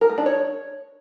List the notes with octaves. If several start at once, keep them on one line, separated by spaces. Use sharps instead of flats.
A#4
A3
D4
C#5